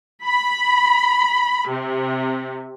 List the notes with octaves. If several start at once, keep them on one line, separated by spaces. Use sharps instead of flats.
B5
C3